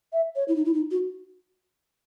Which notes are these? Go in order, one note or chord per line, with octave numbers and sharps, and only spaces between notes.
E5
C#5
E4
D#4
E4
D#4
F#4